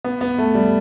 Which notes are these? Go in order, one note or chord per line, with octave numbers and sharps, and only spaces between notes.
B3
B3
A3
G3